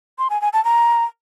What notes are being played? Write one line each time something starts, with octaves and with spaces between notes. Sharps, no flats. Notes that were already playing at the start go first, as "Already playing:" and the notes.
C6
G#5
G#5
A5
A#5